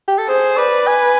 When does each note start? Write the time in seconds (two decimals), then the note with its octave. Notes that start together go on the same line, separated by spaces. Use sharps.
0.08 G4
0.18 A4
0.28 G#4 C5
0.57 B4 D5
0.87 G#5